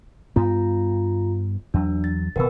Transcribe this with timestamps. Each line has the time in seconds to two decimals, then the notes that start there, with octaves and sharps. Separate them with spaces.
0.36 G2 B3 F4 A#5
1.74 E2 F#3 D4
2.04 A6
2.36 D#1 B2 A#4 B4 E6